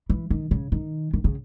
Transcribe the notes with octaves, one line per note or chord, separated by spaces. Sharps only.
E3
D#3
C#3
D#3
D#3
C#3